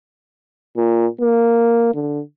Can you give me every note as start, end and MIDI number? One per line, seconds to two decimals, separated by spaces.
0.77 1.06 46
1.21 1.93 58
1.94 2.20 50